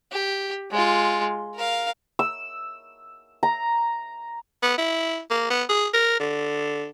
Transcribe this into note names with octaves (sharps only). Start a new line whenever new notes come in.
G4
G#3 F4
A#4 F5
E6
A#5
B3
E4
A#3
B3
G#4
A#4
D3